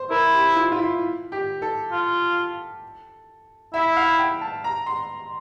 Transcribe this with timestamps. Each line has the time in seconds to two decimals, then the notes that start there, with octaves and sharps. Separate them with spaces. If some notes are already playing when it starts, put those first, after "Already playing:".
Already playing: C5
0.11 E4 A#4
0.34 G4
0.56 F4
0.72 F4
0.79 E4
1.32 G4
1.62 A4
1.92 F4
3.74 E4 E5
3.97 F5
4.19 G5
4.41 A5
4.64 A#5
4.86 C6